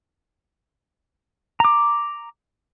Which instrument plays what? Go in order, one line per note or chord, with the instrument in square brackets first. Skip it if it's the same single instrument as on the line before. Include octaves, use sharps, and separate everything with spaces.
[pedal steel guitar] A#5 D6